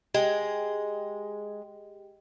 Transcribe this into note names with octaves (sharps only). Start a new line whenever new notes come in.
G#3 G4 D#5 G5